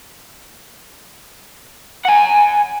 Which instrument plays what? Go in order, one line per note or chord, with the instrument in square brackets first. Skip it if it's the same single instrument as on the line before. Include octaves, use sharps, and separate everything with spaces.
[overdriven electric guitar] F#5 G#5